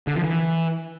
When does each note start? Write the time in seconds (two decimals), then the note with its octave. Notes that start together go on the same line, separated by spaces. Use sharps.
0.07 D3
0.16 F3
0.24 E3